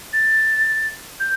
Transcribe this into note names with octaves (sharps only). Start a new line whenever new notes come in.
A6
G6